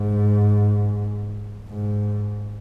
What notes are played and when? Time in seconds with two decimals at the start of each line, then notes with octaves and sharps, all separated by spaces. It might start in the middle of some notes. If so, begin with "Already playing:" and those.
Already playing: G#2
1.68 G#2